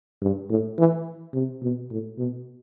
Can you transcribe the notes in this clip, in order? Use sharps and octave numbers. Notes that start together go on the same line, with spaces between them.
G2
A2
E3
C3
B2
A2
B2